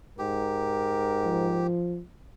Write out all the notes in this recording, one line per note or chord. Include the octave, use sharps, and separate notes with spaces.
G#2 G4 A#4
F3